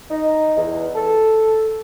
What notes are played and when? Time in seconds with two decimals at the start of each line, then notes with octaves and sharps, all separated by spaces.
0.10 D#4
0.57 E2
0.96 A4